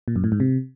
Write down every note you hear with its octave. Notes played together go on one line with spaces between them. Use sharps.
A#2
F#2
A2
G#2
C3